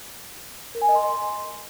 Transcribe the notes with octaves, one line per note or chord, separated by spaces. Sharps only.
A#4
G#5
D#5
C6